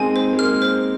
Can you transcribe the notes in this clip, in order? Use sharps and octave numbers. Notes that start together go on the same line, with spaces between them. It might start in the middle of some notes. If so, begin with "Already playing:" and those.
Already playing: G#3 A#3 C4 D#4 G#5
C5
G#3
A#3 F6
C5